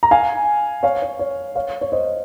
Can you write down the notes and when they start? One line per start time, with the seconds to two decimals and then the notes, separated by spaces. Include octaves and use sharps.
0.03 A#5
0.11 F5 G#5
0.83 C#5 F5
1.02 C#5
1.19 C#5
1.56 C#5 F5
1.81 C#5
1.92 C5 D#5